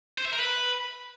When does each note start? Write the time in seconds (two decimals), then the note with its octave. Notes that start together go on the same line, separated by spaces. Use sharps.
0.18 C5
0.25 E5
0.32 A#4
0.39 B4